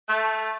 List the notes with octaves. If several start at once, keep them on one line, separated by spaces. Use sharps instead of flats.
A3